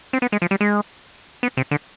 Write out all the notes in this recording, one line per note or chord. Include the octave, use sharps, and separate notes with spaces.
C4
B3
G#3
F3
G3
G#3
B3
C3
D3